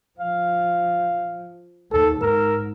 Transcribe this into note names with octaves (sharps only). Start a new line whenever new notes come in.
F3 F5
D#2 A4
G#2 A#4 E6